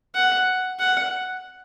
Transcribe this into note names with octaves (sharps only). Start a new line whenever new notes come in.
F#5
F#5